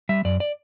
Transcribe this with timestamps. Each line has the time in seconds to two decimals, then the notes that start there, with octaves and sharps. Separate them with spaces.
0.09 G3 E5
0.25 F#2 D5
0.40 D5